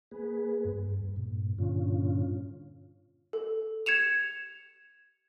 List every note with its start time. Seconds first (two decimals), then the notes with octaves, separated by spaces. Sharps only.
0.11 A#3 G#4 B4
0.65 G2
1.16 G2 A#2
1.58 G2 A#2 D3 C#4 F4
3.33 A4
3.86 G#6 C#7 E7 F7